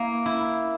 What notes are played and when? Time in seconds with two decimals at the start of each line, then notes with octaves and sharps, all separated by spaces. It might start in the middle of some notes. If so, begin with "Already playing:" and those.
Already playing: A#3 E4
0.26 E4